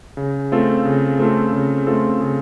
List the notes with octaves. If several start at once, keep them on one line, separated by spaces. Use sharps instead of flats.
C#3
A3 C4 F4 A4
C#3
A3 C4 F4 A4
C#3
A3 C4 F4 A4
C#3